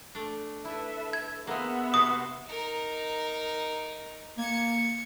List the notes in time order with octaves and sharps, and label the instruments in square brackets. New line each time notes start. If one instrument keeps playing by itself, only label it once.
[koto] A3 D4
[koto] E4 [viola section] A4 B4 E5
[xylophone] G#6
[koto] G#3 A#3 [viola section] B3 E5 F#5
[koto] C3 F#4 C5 [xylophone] D#6
[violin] D#4 A#4
[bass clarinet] A#3 [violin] G#6 C#7